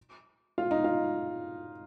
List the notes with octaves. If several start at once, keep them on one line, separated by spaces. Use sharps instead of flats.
F4
D#4
F4